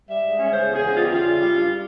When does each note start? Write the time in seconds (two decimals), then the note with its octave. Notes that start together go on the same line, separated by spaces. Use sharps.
0.09 G3 E5
0.23 G#2
0.37 C#4
0.51 C#3 C5
0.66 E2
0.73 G#4
0.81 E2
0.94 G3 F4
1.03 G4
1.10 C#3 F4
1.24 E4
1.38 G3
1.53 G2